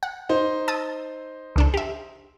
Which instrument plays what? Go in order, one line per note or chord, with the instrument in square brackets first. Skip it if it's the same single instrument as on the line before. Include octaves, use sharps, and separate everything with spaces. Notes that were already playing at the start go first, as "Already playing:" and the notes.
[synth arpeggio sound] F#5
[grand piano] D#4 C5
[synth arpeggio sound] A5 D#6 E6
C#2 D4 A4
G4 E5